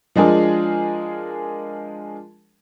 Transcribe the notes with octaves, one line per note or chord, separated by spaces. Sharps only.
F3 G#3 D4 G#4 A#4